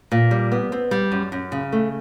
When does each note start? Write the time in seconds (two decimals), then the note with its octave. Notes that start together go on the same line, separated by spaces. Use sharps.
0.12 A#2
0.31 G3
0.52 B3
0.72 C4
0.91 G3
1.12 F#2
1.32 F#2
1.52 C#3
1.72 A3